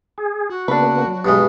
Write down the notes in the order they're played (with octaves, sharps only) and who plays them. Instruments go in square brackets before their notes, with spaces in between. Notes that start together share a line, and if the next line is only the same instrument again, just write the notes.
[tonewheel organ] G#4
[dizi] F#4
[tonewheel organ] C#3 A#3 B3 [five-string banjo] D4 B4
[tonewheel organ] F#3
[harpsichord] G2 B2 G#3